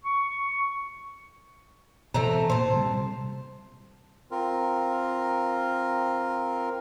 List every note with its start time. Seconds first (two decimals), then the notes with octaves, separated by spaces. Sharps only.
0.04 C#6
2.14 B2 E3 A3 C4 A#5
2.50 A#2 C5 A5
2.73 C3 G3
4.31 C4 F4 A#4